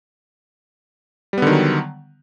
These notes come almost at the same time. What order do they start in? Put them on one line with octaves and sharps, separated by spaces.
G3 B3 D3 D#3 F#3